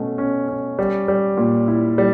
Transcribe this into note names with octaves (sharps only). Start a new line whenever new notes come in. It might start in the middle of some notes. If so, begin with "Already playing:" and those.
Already playing: B2 A3 C#4
C#4
C#4
G3
G3
A#2
E4
G3